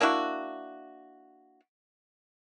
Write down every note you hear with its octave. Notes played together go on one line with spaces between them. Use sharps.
A#3 D4 E4 F#4